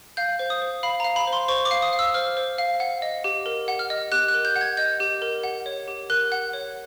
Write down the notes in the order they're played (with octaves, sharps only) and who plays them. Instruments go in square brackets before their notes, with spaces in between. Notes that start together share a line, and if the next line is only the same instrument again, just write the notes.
[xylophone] F5 G6
C5
D#6
C5
F5 B5
F5 A#5
B5
C5
C6
C5 C#6
D6
F5
D#6
F5
E6
C5 F6
C5
F5
F#5
D#5
G4
A#4
F#5
F6
D#5
G4 F#6
F#6
A#4
G6
F#5
G#6
D#5 G6
G4
A#4
F#5
C#5
G4
A#4 F#6
F#5
C#5